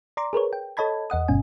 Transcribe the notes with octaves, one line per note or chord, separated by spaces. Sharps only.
D5 A#5 C6 D6
G#4 A#4 B4 C#5
G5
A4 C#5 D#5 A5 B5 G#6
E2 D#5 F#5 D#6
G1 G2 B2 C#4 G#5